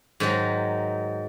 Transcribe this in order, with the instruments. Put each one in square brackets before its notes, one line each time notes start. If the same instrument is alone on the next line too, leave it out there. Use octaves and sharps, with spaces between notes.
[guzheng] G#2 D#3 F#3